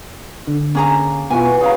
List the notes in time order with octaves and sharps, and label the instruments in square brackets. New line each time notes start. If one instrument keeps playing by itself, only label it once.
[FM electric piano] D3
[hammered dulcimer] A#3 [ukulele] C#4 G#4 A#5
[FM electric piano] B2 F4 [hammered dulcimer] E3 F#4 C#6 [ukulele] G#5
[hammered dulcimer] C#3 B4 A#5 [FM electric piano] F#4 [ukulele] G#4 F5